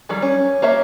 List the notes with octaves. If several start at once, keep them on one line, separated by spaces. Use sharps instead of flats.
D#3 F#3 G3
C#4
A#3 C#5 E5